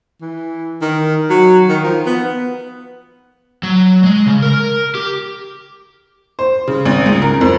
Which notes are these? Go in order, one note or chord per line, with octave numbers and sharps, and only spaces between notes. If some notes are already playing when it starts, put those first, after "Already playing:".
E3
D#3
F#3
D#3
F3
B3
F#3
G#3
C#3
A#4
G4
C5
C#3
G#1
C#2
A#4
F2